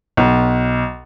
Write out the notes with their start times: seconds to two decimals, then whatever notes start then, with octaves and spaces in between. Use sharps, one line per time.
0.17 B1